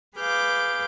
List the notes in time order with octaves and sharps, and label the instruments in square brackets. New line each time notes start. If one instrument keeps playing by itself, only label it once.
[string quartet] G#4 B4 F5 D6 G6